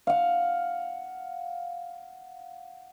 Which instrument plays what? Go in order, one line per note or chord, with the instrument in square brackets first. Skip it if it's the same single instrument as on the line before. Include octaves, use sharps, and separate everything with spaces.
[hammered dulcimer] F5 F#5